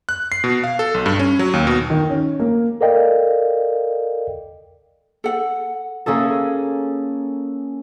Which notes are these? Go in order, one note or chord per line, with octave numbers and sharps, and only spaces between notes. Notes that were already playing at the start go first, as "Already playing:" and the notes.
F#6
C7
B2
F5
A4
B1
G2
C#4
F#3
D#2
B2
D#3
C#4
A#3
A4 A#4 D5 D#5 F5 G5
A4 F#5
A#3 C#4 G#4 A4